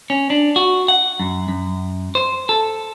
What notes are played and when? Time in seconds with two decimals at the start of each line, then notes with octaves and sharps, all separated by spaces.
0.10 C#4
0.30 D4
0.56 F#4
0.88 F#5
1.20 F#2
1.49 F#2
2.15 C5
2.49 A4